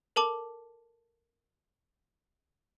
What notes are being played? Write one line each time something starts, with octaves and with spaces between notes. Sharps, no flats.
A4 A#4 A5 D6